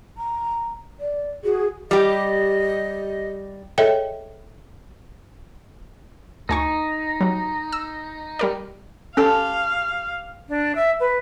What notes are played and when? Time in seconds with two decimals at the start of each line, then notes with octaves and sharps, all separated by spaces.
0.17 A#5
0.99 D5
1.44 F#4 G#4
1.91 G3 G4 D#5
3.78 G#4 A4 C#5 D#5 E5 G5
6.49 D2 D#4 G#5 C#6
7.21 F#3 G3
7.72 E6
8.39 G3 A#4 D5
9.17 C#4 G4 A4 F5 A5 C6
10.48 D4
10.75 E5
11.00 B4